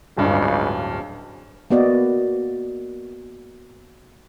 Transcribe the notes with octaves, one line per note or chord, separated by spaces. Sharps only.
D1 C#2 G2
A#3 B3 F#4 D5 D#5